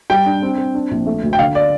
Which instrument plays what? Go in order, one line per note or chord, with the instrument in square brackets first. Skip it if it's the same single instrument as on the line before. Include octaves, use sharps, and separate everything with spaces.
[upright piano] G3 G5
D4
C4
C4
D4
A#1
A3
D2
G5
D3 F5
D5